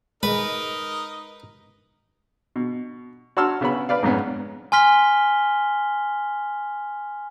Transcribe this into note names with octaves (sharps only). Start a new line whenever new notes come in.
G#3 D#4 A#4 B4 D#5
B2
F#4 C#5 A5 C6 E6 F6
C#3 B3 C#4 B5
B4 D5 F5
F2 G#2 B3 C#4
G#5 C6 F6 B6 G7